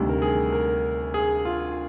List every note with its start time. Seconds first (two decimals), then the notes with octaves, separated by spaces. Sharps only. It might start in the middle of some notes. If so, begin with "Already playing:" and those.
Already playing: D2 C3 D#3 G3
0.09 A#4
0.22 G#4
0.52 A#4
1.14 G#4
1.45 F4